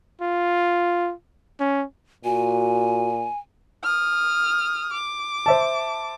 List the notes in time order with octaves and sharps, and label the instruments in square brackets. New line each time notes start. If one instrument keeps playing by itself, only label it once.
[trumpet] F4
C#4
[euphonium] A#2 [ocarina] F#4 [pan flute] G#5
[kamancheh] D#6 F6
D6
[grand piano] C5 E5 A5